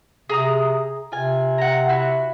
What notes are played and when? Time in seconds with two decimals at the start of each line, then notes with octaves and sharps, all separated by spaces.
0.30 C3 G#4 A#5 D#6
1.12 C3 F4 G#5
1.58 F#5 A#5
1.89 E4 F#4